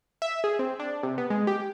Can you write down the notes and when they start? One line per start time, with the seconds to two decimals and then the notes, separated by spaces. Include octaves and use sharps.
0.22 E5
0.44 G#4
0.59 C4
0.80 D4
1.03 C3
1.18 B3
1.30 G#3
1.47 G4